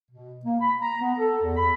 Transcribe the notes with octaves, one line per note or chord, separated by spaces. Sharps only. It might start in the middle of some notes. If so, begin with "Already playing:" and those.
B2
A#3
B5
A#5
B3
A4
E2
B5